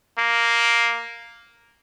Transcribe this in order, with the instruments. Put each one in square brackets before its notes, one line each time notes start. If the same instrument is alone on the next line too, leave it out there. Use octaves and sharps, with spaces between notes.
[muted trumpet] A#3